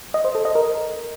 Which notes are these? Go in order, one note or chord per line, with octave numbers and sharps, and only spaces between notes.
D#5
C5
A4
D#5
A#4